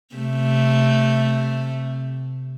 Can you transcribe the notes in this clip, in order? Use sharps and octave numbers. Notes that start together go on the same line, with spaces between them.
C3 A3